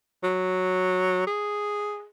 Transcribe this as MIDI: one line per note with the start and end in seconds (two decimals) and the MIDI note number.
0.23 1.24 54
1.27 2.07 68